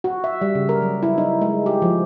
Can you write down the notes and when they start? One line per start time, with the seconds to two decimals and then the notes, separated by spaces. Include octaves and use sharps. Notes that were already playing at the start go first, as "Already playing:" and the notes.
0.04 F#4
0.24 E5
0.41 G3
0.55 C#3
0.69 A#4
0.82 F#3
1.03 E4
1.18 D#4
1.41 G#3
1.66 G4
1.82 F3